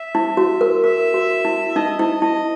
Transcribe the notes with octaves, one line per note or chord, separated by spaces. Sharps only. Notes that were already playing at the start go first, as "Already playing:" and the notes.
Already playing: E5
E4
F#4
A#4
A#4 E5
F#4
E4
D#4 D#5
E4
E4